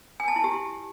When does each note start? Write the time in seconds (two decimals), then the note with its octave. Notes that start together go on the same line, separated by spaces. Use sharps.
0.20 G#5
0.28 A5
0.36 E4
0.44 G4